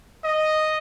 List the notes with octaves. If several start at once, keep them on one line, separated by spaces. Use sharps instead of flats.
D#5